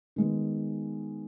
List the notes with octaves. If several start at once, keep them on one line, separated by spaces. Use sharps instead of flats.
D#3 G#3 B3